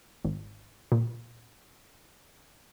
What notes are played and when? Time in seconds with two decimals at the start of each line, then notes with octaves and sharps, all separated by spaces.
0.25 G#1
0.92 A#2